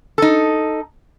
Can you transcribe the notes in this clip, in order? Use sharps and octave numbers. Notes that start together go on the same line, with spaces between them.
D#4 A4